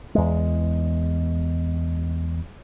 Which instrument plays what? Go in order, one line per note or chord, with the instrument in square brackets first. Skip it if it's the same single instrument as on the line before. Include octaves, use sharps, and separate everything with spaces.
[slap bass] E2 G#3